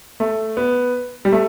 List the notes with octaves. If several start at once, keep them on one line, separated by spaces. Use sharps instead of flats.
A3
B3
G3
A3